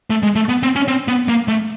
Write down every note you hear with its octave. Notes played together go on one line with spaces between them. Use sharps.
A3
G#3
A3
B3
C4
C#4
C4
B3
A#3
A3